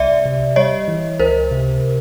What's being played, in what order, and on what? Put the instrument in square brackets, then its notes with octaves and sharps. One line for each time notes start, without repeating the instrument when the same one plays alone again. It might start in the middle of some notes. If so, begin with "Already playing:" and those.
Already playing: [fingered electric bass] C2 [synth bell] D5 E5
[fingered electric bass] C3
[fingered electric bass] G3 [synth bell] C#5 D#5
[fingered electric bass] E3
[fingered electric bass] C#2 [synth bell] A#4 C5
[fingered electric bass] C3